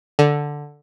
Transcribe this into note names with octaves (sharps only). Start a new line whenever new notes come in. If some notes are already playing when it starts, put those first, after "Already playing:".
D3